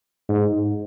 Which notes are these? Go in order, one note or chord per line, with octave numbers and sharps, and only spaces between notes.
G#2